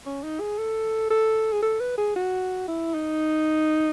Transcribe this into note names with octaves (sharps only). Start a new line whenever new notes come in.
C#4
D#4
G#4
A4
A4
G#4
A4
B4
G#4
F#4
E4
D#4